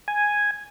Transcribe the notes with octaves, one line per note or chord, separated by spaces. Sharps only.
G#5